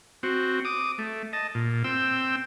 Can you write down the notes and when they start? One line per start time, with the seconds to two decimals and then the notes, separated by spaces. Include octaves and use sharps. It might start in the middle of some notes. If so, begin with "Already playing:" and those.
0.23 C4 F#4
0.65 D6 D#6
0.98 A3
1.33 D#5 A5
1.55 A#2
1.84 C4 G5 E6